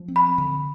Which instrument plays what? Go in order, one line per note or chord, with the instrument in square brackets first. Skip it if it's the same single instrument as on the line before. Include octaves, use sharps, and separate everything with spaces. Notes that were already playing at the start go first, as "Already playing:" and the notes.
Already playing: [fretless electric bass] F3
C4
[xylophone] B5
[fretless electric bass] D3